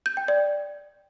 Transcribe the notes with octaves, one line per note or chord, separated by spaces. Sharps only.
G6
G5
D5